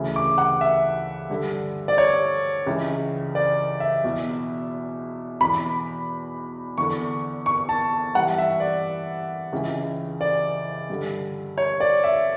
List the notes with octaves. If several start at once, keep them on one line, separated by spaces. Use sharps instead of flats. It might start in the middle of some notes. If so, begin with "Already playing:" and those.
Already playing: D2 C#3 E3
D6
F#5
E5
G2 D3
D5
C#5
C#2 C#3 E3
D5
E5
E2 B2
E2 B2 B5
E2 D3 C#6
C#6
A5
G2 E3 F#5
E5
D5
C#2 C#3 E3
D5
G2 D3
C#5
D5
E5